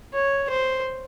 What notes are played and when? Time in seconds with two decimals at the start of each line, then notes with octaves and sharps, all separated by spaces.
0.13 C#5
0.50 C5